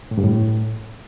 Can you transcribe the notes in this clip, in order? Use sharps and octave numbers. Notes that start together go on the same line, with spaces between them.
A2
G2
A2